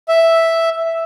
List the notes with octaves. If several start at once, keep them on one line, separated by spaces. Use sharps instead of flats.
E5